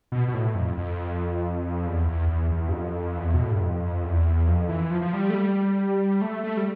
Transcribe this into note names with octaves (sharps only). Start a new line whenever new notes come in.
B2
B2
A2
F2
F2
E2
E2
E2
E2
G2
F2
E2
B2
A2
G2
F2
E2
F2
E3
F3
F3
G3
A3
G3
A3
A3
G3